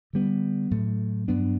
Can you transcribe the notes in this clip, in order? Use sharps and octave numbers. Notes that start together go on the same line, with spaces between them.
D3 G3 B3
A2 F#3 A3
G2 F#3 B3 D4